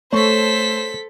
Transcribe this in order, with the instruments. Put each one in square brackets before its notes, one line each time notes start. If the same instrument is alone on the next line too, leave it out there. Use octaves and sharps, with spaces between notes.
[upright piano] A3 [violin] A4 B6 [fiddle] C5 [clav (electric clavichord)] C#5